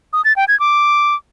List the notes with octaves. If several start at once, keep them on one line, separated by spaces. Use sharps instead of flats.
D#6
A6
G5
G#6
D6